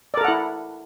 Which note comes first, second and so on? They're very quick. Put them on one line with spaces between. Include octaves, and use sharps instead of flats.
D5 A#4 A4 F#5 E4